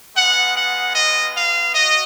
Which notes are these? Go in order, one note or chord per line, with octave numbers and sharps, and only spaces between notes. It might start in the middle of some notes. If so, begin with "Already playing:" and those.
G#3 B3 F4 F#5
F#5
D#5
F5
F#4 D#5